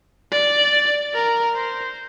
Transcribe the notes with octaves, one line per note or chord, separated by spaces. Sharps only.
D5
A#4
C5